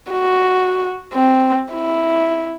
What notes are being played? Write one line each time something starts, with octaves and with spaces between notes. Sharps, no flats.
F#4
C4
E4